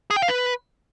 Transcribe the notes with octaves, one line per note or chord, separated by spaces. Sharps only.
G#4
G5
F5
B4